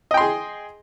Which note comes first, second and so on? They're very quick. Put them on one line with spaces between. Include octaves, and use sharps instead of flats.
D#5 G5 C6 G#4